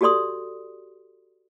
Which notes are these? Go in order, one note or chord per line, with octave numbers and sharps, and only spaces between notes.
F#4 G4 A4 D5 C6 D#6